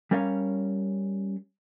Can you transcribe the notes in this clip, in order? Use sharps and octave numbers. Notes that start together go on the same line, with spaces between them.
G3 C#4 A#4 C#5 F5